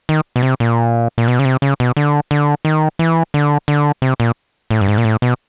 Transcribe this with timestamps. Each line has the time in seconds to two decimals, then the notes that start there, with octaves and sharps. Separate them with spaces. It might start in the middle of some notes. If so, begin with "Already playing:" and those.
0.09 D#3
0.36 B2
0.43 C3
0.60 A#2
1.18 A#2
1.28 B2
1.39 C#3
1.45 C3
1.62 C#3
1.80 B2
1.97 D3
2.31 D3
2.65 D#3
2.99 E3
3.34 D3
3.68 D3
4.02 C3
4.20 A#2
4.71 A2
4.81 G2
4.88 G#2
4.98 A#2
5.05 A2
5.22 B2